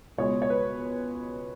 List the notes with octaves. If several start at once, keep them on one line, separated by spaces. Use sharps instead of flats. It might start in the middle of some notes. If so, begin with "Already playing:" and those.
C#2 B2 G#3 C#5
C#5
B4